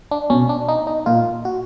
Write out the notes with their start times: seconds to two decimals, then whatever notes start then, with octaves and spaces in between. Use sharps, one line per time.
0.11 D4
0.30 B2 C#4
0.49 D4
0.69 D#4
0.87 D#4
1.06 A#2 F4
1.45 F#4